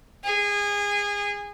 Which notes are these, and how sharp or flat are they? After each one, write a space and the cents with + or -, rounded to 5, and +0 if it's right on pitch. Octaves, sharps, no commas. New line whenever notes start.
G#4 -25